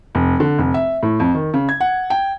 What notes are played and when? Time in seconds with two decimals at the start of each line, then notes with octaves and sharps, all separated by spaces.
0.15 F1
0.40 D3
0.58 F1
0.74 E5
1.03 A2
1.20 F2
1.34 D#3
1.54 C#3
1.69 G#6
1.80 F#5
2.10 G5